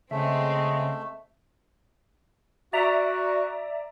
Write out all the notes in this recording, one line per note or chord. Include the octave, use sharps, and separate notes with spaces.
C#3 G#3 A3 C4 E5
F#4 D5 E5 A#5